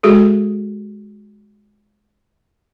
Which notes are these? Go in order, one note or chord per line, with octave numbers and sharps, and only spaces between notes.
G#3 F#4 G#4 A4